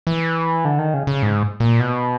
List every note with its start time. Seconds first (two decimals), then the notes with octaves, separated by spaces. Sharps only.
0.07 E3
0.65 D3
0.79 D#3
0.94 C#3
1.07 C#3
1.23 G#2
1.60 A#2
1.80 B2